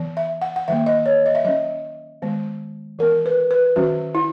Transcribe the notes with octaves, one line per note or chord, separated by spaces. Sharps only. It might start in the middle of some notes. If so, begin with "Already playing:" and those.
Already playing: E3 B3
E5
F#5
F#5
D#3 F#3 A#3 E5
D#5
C#5
D#5
E5
F#3 C#4 D#5
D#3 G#3 B3
E3 B3 A#4
B4
B4
D#3 F#3 C#4 F#4
E4